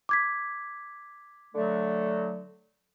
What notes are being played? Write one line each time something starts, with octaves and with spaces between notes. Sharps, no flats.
D6 G#6 B6
D3 F#3 A3